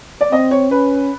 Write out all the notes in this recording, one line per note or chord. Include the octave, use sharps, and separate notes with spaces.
D5
C4 D#5
C#5
C#4 B4